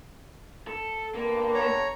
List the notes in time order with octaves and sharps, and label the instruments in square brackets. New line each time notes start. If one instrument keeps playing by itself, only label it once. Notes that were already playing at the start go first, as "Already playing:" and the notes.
[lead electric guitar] A4
[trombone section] G2 D3 B3 [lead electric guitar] A#3
[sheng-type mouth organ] C#5 A#5